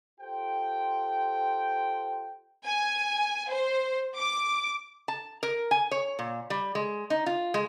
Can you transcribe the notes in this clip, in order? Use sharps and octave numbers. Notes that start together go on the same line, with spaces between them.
F4 G4 A4 C5 G5
G#5
C5
D6
A5
A#4
G#5
C#5
A#2
G3
G#3
D#4
F4
G#3